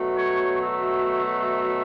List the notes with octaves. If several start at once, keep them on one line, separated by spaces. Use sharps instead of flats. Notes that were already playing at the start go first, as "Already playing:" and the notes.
Already playing: B2 F#3 A3
C#5
E5